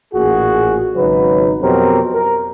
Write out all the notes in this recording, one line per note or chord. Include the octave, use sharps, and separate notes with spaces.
A1 A#2 F#4 G#4
G#1 C#3 F#3 D#4 B4
F2 B2 F#3 C4 G4 A#4
A#4